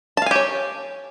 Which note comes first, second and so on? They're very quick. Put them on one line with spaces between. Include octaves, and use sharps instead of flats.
A5 F5 G#5 G4 C#5